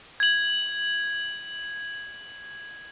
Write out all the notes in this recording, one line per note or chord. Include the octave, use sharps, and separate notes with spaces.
G#6 F#7